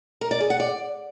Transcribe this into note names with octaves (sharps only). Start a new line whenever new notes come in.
A#4
D5
G#4
F#5
D5